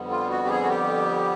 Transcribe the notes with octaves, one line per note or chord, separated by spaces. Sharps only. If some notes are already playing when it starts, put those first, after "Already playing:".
Already playing: F2 D3 G3 B3
F4
F#4
G4
G#4
F#4
G4